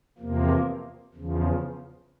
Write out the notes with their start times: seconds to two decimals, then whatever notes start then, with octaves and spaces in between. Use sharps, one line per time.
0.18 E2 C3 F3 A#3
1.14 E2 C#3 F3